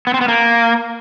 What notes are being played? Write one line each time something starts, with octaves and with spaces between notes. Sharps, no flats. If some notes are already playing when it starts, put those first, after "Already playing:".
B3
C4
B3
A#3